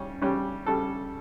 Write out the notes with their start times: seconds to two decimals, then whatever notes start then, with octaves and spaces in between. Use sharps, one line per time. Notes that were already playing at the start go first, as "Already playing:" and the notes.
Already playing: C#3 G3 C#4
0.22 C#3 G3 C#4
0.66 C#3 G3 A4